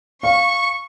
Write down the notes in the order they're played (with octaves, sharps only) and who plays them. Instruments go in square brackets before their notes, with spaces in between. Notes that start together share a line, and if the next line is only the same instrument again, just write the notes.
[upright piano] F5 [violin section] C#6